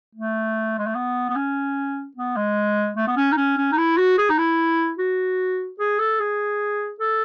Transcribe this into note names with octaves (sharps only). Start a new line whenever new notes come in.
A3
G#3
A3
B3
B3
C#4
B3
G#3
A3
B3
C#4
D#4
C#4
C#4
D#4
E4
F#4
G#4
D#4
E4
F#4
G#4
A4
G#4
A4